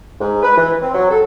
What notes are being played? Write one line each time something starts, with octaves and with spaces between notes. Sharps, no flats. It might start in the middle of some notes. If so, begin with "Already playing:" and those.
G#2
B4
E3
C4
F#3
A4